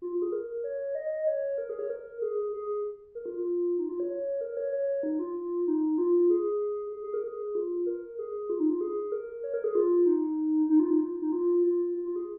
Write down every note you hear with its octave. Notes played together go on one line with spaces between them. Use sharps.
F4
F4
G#4
A#4
C#5
D#5
C#5
A#4
G#4
C#5
A#4
G#4
G#4
A#4
F4
F4
D#4
F4
C#5
C#5
A#4
C#5
C#5
D#4
F4
D#4
F4
G#4
G#4
G#4
A#4
G#4
F4
A#4
G#4
F4
D#4
F4
G#4
A#4
C#5
A#4
G#4
F4
D#4
D#4
F4
D#4
F4
D#4
F4
F4
F4
F4
G#4